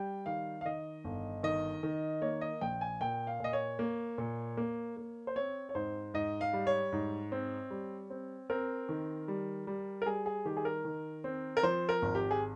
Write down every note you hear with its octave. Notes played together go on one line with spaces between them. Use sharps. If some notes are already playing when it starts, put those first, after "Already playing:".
Already playing: G3 G5
D#3 F5
F5
D#3 D#5
G1
D#3 D#5
D#3
A#3 C#5
D#5
A#1 G5
G#5
A#2 G5
F5
A#2 D#5
C#5
A#3
A#2
A#3
A#3
C5
C4 C#5
C#5
G#2 C5
G#2 D#5
F5
G3
C#5
G#2
C4
G3
C4
C4 A#4
D#3
G3
G3
A#4
G3 G#4
G#4
D#3 G4
G#4
A#4
D#3
C4
A#4
F3 C5
A#4
G#1
G4
G#4